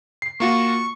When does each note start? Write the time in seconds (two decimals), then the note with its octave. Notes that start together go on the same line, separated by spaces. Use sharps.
0.22 C7
0.40 A#3 F4 F#4 C#6